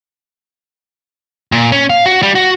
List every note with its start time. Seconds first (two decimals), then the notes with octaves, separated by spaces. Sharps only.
1.52 A#2
1.72 C#4
1.90 F5
2.06 F#4
2.23 G3
2.35 F#4